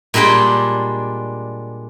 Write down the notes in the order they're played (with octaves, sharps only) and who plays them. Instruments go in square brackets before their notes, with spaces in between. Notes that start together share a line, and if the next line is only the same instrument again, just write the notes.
[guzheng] A#2 G3 G#3 D4 G5